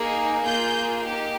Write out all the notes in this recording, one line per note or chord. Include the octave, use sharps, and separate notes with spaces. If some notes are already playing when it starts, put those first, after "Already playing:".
Already playing: A#3 D#4 G#4
A#3 F4 G#4 G6
A#3 D#4 G4